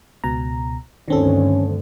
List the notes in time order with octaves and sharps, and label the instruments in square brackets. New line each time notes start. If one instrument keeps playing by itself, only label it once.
[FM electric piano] C#2 B2 A#5
[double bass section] D2 G2 [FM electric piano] D#3 C4 A4 [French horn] C#4